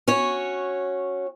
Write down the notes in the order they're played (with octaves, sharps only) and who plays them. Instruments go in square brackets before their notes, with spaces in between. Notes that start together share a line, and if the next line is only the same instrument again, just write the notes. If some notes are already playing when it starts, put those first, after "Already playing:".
[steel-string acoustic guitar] C#4 F#4 C#5